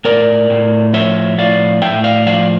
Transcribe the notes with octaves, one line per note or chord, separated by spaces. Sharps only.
A2 A#4 D5
A2
F3 C#5 E5
A2 D5 F5
A2 E5 G5
D5 F5
F3 D5 F5